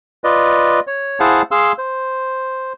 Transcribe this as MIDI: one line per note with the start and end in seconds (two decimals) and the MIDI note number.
0.24 0.80 65
0.24 0.80 71
0.24 0.80 74
0.24 0.80 75
0.87 1.19 73
1.20 1.42 64
1.20 1.42 68
1.20 1.42 72
1.20 1.42 77
1.20 1.42 78
1.20 1.42 81
1.51 1.72 68
1.51 1.72 77
1.51 1.72 84
1.51 1.72 88
1.78 2.73 72